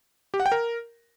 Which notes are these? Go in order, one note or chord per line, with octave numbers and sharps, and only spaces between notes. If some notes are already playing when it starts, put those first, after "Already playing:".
G4
F#5
G5
A#4